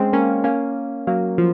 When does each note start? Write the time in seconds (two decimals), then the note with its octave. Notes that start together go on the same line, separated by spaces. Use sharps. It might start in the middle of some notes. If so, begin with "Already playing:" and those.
Already playing: G#3 C4 C#4
0.13 A#3 C#4
0.44 A#3 C#4
1.07 F#3 A#3
1.38 F3